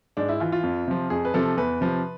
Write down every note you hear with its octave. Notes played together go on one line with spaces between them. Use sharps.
G#2 D4
E4
E3 F4
F4
F2
C3 F3
F2 G#4
B4
C3 F3 A4
E2 B4
C3 F3